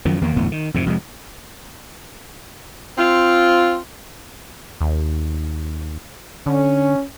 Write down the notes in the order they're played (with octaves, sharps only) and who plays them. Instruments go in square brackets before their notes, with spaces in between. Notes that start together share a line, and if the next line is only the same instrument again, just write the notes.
[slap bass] F#2 D#3 F3
E2 D#3 A#3
G1 E2 A2 B3
D#3
F2 G#2 C3
F2 C3 G#3
[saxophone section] C4 F4
[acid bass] D#2
[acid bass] D3 [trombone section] C#4